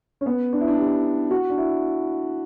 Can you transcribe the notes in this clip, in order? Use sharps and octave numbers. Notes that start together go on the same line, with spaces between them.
C#4
B3
D4
E4
D4
G4
F#4
D4
E4